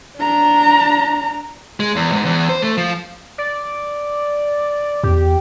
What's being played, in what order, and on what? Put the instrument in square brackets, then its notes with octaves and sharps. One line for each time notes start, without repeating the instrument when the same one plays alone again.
[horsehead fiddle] D4 A#5
[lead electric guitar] G#3
E2
G#2
E2
C5
A3
F3
[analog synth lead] D5
[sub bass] E2 [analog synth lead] G4